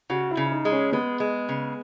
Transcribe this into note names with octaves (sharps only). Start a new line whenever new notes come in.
C#3 F#4
E4
C#3
E4
D#4
G#3
C#4
G#3 B3
G#3
C#3